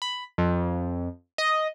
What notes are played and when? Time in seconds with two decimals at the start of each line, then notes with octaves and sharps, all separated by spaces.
0.02 B5
0.38 F2
1.38 D#5